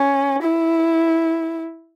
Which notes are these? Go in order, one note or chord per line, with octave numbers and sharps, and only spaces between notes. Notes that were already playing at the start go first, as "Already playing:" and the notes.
Already playing: C#4
E4